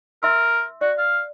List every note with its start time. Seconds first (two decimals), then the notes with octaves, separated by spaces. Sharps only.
0.23 A#4 E5 C6 E6
0.81 F#4 D5
0.98 F5